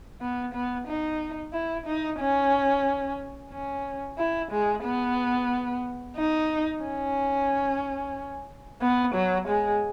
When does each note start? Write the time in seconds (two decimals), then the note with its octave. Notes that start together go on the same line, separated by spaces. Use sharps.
0.21 B3
0.54 B3
0.87 D#4
1.53 E4
1.86 D#4
2.20 C#4
3.52 C#4
4.18 E4
4.52 G#3
4.84 B3
6.17 D#4
6.83 C#4
8.81 B3
9.15 F#3
9.48 G#3